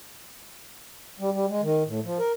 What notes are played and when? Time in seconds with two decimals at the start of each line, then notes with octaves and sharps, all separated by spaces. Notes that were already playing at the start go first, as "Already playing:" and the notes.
1.19 G3
1.33 G3
1.48 G#3
1.62 D#3
1.86 A2
2.04 F3
2.19 A#4